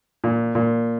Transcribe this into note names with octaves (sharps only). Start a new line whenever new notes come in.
A#2
A#2